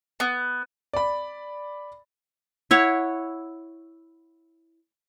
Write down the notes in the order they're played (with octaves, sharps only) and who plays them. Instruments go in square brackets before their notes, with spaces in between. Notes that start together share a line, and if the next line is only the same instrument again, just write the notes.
[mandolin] B3
[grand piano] D5 B5
[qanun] E4 C#5 F#5